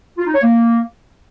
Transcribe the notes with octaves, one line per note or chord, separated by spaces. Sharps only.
F4
D#4
C#5
A#3